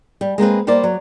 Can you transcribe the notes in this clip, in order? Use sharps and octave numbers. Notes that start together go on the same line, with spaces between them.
G3
G#3 A#3 C4 B4
G3 A#3 C5 D5
F#3